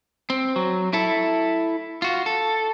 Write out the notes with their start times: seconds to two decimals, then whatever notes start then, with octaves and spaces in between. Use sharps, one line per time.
0.30 C4
0.56 F#3
0.93 E4 A4
2.02 F4 F#4
2.26 A4